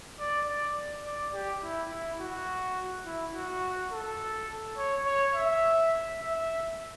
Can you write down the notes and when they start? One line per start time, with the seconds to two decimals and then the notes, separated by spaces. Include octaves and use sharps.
0.20 D5
0.48 D5
1.05 D5
1.34 G4
1.63 E4
1.91 E4
2.20 F#4
3.06 E4
3.34 F#4
3.91 A4
4.77 C#5
5.05 C#5
5.34 E5
6.20 E5